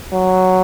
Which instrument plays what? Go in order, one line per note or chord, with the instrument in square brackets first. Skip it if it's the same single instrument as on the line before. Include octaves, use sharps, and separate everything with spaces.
[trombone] F#3